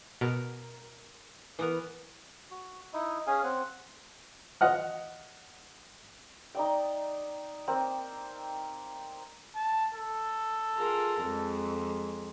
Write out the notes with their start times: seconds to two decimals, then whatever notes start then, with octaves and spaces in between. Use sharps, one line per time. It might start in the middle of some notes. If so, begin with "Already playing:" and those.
0.21 B2 A#4
1.59 E3 B3 A#4
2.51 F#4
2.93 D#4 E4 D#5
3.27 C#4 G#4 F5 G#5
3.44 C4 F#5
4.61 D#5 F#5 F6
6.55 D#4 D5 G5
7.68 A#3 C4
9.55 A5
9.95 A4
10.76 F4 G#4 A#4
11.23 F2 G#3